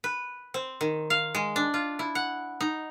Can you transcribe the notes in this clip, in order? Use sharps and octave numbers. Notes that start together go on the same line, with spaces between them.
B4
C4
D#3
F5
G#3
D4
F4
E4
F#5
D#4